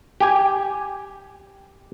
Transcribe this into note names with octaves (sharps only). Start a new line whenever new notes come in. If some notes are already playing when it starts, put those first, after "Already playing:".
G4 G#5